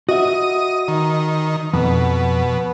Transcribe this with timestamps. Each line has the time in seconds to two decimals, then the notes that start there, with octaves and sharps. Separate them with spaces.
0.09 F#4 D#5 E5
0.88 D#3
1.73 F2 B2